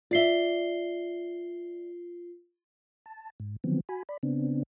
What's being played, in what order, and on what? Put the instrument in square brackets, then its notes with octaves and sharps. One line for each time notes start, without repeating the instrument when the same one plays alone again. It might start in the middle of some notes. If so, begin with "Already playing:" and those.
[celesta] F4 C7 G7 [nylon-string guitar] D5 E5
[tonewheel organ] A5
G#2
D3 D#3 F3 F#3 B3 C4
F#4 G#5 B5
D5 B5
C#3 B3 C4 D4